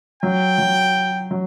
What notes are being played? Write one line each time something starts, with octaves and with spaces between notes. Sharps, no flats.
F#3 G5
F#3
F#3